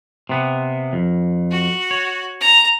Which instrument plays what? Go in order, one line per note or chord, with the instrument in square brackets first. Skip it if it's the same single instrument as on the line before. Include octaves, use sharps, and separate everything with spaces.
[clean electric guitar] C3 B3
F2
[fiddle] F#4
[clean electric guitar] C#5
[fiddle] A#5